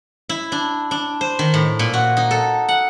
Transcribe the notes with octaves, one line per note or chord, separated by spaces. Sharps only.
E4
D4
D4
C5
D#3
A2
A#2
F#4
D#4
A4
F#5